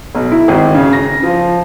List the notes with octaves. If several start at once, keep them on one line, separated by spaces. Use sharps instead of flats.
B1
E4
G#1
C#3
A#6
F3